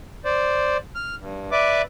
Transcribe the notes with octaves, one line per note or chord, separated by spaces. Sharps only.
C5 D5
F6
G2
B4 D5 E5 D6